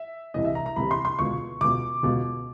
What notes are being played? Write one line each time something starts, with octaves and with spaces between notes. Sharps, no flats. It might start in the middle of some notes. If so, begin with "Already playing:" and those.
Already playing: E5
C2 C3 E3 D#5
E5
A#5
A#5
C2 C3 E3 B5
C6
C6
C#2 B2 C#6
C#2 B2 D6
C#2 B2